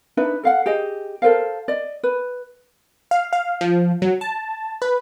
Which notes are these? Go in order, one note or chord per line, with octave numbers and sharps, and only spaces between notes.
D4 D#4 B4 E5
A4 F5 F#5
G4 G#4 D#5
A4 A#4 C5 F5
D5 D#5
B4
F5
F5
F3
F#3
A5
B4